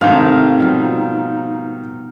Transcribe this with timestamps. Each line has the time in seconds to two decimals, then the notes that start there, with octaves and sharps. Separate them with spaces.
0.01 G#2 C3 D#3 A3 D#4 F5
0.59 B2 F3 G3